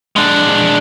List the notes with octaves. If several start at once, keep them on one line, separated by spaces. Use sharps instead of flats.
G#3 D4